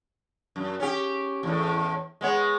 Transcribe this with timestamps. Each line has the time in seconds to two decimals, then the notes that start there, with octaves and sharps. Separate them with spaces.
0.56 F#2
0.80 C#4 G4
1.43 E2 A2
2.21 G#3 B3 C#5